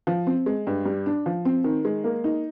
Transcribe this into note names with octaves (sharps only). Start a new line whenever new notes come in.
F3
C4
G#3
G2
G3
D4
F3
C4
D#3
G#3
A#3
D#4